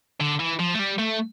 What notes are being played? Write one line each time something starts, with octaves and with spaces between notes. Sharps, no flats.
D3
E3
F3
A3
G3
A3